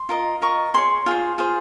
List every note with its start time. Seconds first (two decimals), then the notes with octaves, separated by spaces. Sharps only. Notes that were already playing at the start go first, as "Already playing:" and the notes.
Already playing: C6
0.09 F4 A#4 D#5
0.42 F4 A#4 D#5 C#6
0.74 G#4 C#5 C6
1.06 F4 G#4 C5
1.38 F4 G#4 C5